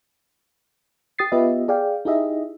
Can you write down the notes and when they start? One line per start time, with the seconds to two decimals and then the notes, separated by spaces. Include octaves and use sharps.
1.19 G4 D#6 A6 C7
1.32 B3 F4 G4 B4 D#5 E5
1.68 G#4 D5 F5 G5
2.05 D#4 E4 G4 G#4 D#5 E5